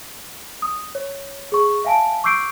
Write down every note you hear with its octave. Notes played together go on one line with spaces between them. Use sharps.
D#6
C#5
G#4 C#6
E5 F5 G#5 A5 D7
C#6 D6 E6 G6 C7 D7